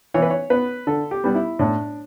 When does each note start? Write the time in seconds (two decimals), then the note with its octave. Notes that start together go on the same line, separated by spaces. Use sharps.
0.14 E3 C#5
0.22 B4
0.30 C#5
0.50 B3 B4
0.87 D3 A4
1.11 G4
1.24 G3 B3
1.35 E4
1.59 A2 D4